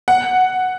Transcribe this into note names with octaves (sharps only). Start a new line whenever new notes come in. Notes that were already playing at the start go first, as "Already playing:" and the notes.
F#5